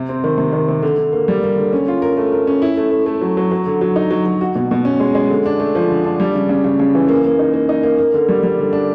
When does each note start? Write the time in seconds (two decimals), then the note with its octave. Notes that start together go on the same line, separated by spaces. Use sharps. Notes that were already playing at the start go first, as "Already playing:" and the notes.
Already playing: C3
0.09 C4
0.24 D#3
0.38 C3
0.53 D#3
0.69 C3
0.82 D3
0.98 D3
1.13 A#3
1.28 G3
1.43 A#3
1.58 D3
1.73 C#4
1.88 F4
2.02 A#4
2.17 A3
2.32 A#4
2.47 C#4
2.62 E4
2.77 A3
2.91 A3
3.06 A3
3.21 F#3
3.37 F#3
3.51 F#3
3.67 D3
3.81 F#3
3.96 D#4
4.11 F#3
4.26 F#3
4.41 F#4
4.55 B2
4.71 B2
4.85 C#4
5.00 G#3
5.15 G#3
5.30 D3
5.46 D4
5.59 A3
5.75 F3
5.90 D3
6.04 D4
6.20 G3
6.35 C#3
6.49 C#3
6.64 C#3
6.80 C#3
6.95 E3
7.09 A#3
7.24 A#3
7.39 D#4
7.54 A#3
7.69 D#4
7.83 A#3
7.98 A#3
8.14 D3
8.28 G3
8.43 G3
8.59 D3
8.73 D4